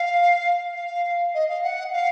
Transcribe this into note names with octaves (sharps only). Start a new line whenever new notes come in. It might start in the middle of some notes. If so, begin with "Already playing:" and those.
Already playing: F5
F5
D#5
F5
F#5
F5